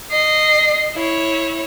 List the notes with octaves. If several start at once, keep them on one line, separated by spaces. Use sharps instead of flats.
D#5 C7
E4 C#5